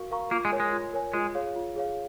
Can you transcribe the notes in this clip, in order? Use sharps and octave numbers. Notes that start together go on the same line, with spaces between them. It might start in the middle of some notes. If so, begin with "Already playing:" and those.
Already playing: F#4 A#4 F5 C#6
A#4 F5 A#5 C#6
A#3 F4
G#3
A#4 C#5 G#5
G#3
F4
A#4 C#5 G#5
G#3 F4
G#4 C#5 F5
F4
G#4 C#5 F5